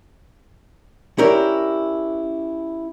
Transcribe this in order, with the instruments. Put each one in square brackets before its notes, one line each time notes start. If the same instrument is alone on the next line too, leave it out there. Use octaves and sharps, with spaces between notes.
[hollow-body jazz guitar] C#4 D4 E4 G4 A#4